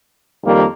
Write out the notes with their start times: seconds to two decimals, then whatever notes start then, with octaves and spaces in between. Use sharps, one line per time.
0.44 F2 D#3 G3 A#3